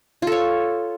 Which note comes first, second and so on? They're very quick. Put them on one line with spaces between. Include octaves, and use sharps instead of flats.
F4 A4 C#5